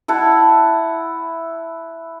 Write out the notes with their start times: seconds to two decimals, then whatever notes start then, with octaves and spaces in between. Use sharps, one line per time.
0.08 E4 F#5 A5